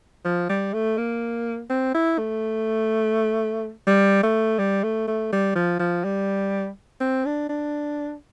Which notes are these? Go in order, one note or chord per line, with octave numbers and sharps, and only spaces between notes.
F3
G3
A3
A#3
C4
E4
A3
G3
A3
G3
A3
A3
G3
F3
F3
G3
C4
D4
D4